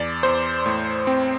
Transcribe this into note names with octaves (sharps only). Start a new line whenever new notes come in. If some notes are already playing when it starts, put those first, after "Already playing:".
Already playing: E2 D5
E2 C5
A2
C4